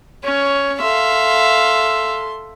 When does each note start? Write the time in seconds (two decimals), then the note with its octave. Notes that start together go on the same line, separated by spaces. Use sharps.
0.24 C#4 C#5
0.81 A4 E5 F5 C6